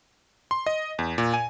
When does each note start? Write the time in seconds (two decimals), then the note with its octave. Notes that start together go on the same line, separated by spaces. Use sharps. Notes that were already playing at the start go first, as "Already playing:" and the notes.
0.51 C6
0.66 D#5
0.99 E2
1.18 A#2
1.34 G#5